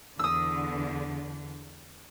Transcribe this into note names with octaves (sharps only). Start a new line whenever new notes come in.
E2 D3 D#6 E6